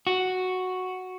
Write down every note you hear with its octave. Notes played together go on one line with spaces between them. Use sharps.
F#4